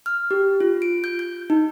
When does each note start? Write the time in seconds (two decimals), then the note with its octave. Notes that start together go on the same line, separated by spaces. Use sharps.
0.06 F6
0.31 G4
0.60 F4
0.82 D7
1.04 G6
1.19 G6
1.50 D#4